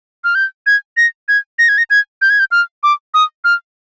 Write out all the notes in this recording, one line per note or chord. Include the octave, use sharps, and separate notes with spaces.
F6
G6
G#6
A#6
G#6
A#6
G#6
A#6
G#6
G6
G#6
G6
F6
D6
D#6
F6